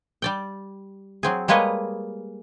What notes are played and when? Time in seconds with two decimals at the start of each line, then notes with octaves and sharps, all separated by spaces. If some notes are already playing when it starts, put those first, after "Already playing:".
0.22 G3 D5 G5
1.23 F#3 C4 G#4
1.48 G3 G#3 A#3 B4 C#5 D#5